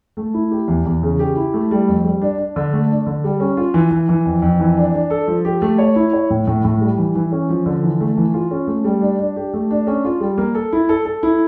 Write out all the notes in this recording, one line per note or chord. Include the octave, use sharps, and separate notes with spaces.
A3
E4
G4
E2
E2
C#3
G4
E4
A3
G3
F2
G3
D4
D4
D3
A3
D4
D3
G3
C#4
F4
E3
E3
E3
F2
F2
E3
D4
D4
A4
F3
G4
A3
C#5
E4
C#5
A2
A2
A2
G3
E3
E3
C#4
F3
D3
E3
A3
E3
F4
C#4
A3
G3
D4
D4
G4
A3
D4
C#4
F4
G3
A#3
A4
E4
A4
A4
E4